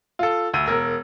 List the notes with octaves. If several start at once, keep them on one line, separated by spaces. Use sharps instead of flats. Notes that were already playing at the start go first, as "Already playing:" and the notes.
F4 A4
D2 E6 D#7
E1 A#4 E6